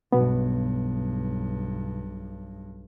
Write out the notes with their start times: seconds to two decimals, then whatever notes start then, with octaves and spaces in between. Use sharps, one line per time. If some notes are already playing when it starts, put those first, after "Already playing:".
0.12 B1 G2 B2 B3